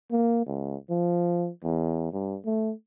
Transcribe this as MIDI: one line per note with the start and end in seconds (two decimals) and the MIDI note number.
0.11 0.45 58
0.46 0.76 37
0.90 1.49 53
1.64 2.10 40
2.13 2.37 43
2.45 2.72 57